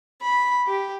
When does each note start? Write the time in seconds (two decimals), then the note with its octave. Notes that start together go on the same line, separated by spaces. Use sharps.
0.21 B5
0.67 G4